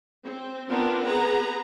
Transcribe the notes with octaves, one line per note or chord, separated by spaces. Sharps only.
C4
B3 C4 D4 F4 A#4
B3 G#4 B4 A#5